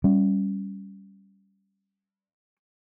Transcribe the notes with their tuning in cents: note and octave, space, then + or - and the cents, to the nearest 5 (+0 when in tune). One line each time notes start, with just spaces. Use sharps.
G3 +0 C#4 +0